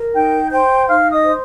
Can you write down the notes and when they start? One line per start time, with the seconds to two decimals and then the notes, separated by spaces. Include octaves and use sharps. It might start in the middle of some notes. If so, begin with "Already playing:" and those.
Already playing: A#4
0.15 D#4 G5 G6
0.51 C5 G5 G6
0.88 D#4 F5 F6
1.12 D#5 D#6
1.25 C5